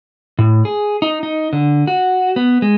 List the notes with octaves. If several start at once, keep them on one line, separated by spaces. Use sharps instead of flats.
A2
G#4
D#4
D#4
D3
F#4
B3
G#3